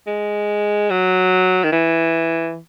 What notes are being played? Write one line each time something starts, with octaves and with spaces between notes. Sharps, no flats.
G#3
F#3
D#3
E3